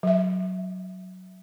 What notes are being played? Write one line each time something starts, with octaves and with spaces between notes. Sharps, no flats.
F#3 E5